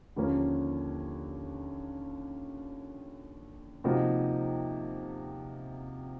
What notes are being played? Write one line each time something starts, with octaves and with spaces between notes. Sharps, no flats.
D#2 D3 F3 A#3 C#4
C3 F3 A#3 D#4 F#4